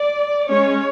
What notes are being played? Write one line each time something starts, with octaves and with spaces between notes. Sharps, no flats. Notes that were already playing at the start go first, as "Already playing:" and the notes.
Already playing: D5
G#3 C#4 C#5